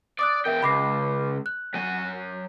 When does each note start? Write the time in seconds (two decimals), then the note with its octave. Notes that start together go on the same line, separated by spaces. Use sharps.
0.19 D5 D6 D#6 F#6
0.45 E2 A#4 E5 G5
0.63 C#2 B5 D6 C7
1.46 F#6
1.74 F#3 G#5